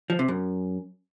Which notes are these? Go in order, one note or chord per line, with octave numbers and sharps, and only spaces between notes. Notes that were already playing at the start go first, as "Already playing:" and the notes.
F3
C3
F#2